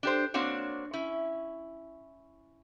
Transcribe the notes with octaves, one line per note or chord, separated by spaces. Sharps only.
D4 G4 C5
A#3 C4 D4 F#4 C#5
C#4 E4